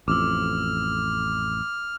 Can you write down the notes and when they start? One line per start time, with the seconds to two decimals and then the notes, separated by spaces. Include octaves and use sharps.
0.08 A1 F2 D6 E6 F6